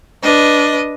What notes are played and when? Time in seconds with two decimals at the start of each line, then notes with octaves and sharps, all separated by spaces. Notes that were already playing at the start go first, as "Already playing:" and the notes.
0.22 D4 B4 D#5